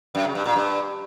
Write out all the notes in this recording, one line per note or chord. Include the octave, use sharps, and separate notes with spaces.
F#2
C#3
G2
A#2
G2